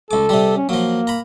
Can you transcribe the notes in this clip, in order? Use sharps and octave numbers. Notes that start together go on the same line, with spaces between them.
C#2 A4 D6
C3 G3
C#4
F3 F#3 A#3
A#5 B5